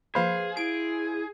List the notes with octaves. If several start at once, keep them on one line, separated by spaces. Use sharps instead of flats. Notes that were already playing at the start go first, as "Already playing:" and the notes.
F3 A#3 G#4 B4 C5 F5
E4 G#4 D7